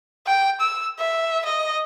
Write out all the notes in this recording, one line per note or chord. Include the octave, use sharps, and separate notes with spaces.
G5
E6
E5
D#5